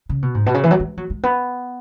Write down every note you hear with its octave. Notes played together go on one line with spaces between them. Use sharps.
C#3
B2
G#2
B2
C#3
E3
F#3
G#3
F#3
G#3
B3